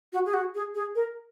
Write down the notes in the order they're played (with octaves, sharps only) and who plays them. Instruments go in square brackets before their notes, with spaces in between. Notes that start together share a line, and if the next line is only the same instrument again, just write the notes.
[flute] F#4
G#4
F#4
G#4
G#4
A#4